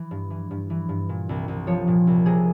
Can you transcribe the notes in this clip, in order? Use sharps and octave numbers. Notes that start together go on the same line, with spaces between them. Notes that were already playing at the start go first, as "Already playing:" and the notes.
Already playing: E3
G2
E3
G2
E3
G2
A#2
C2
C2
F3 C#5
A#2
C2
C3 G#4